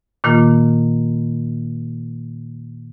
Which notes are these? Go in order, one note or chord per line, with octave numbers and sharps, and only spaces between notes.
A#2 D#3 A#3 F4